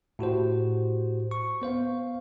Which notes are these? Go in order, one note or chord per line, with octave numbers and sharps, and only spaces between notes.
A2 F#4 G4 C5
C#6
B3 C5 F5